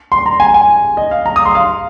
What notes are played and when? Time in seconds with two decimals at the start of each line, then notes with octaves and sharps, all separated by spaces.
0.12 C6
0.26 A#5
0.40 G#5
0.54 G#5
0.97 D#5
1.11 F5
1.26 A#5
1.36 D#6
1.45 C6
1.55 F5